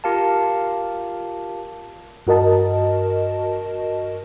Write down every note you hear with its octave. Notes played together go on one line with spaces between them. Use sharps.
F4 G4 A#4 F5 A5
G2 F#4 A#4 D#5 A5